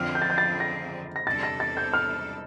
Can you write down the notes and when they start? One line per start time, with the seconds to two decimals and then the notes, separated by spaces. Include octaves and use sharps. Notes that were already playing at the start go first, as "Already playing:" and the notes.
Already playing: F2 D3 F3 C4 F6
0.15 G6
0.22 A6
0.30 G6
0.38 A6
0.60 A#6
1.16 A#6
1.26 E2 C3 G3 D4 A4 A6
1.43 A#6
1.60 A6
1.77 G6
1.94 F6